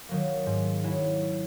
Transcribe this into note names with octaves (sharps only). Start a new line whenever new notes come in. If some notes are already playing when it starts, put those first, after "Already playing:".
D#3 F#3 A#3
G#2
F#3 C#4 E4